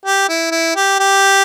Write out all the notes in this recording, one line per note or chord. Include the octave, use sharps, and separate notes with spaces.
G4
E4
E4
G4
G4